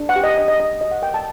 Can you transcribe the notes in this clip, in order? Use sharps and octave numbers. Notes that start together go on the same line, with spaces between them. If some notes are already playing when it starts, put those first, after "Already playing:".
Already playing: D4
F#5
G4
D#5
D4 D#5
D#5
D4 D#5
F#4 D#5
F#5
A#4 G5
A5